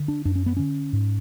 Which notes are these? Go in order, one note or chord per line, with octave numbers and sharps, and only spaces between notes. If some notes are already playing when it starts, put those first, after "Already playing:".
Already playing: D3
D4
F#2 D4
C#4
B3
D3 C#4
G#2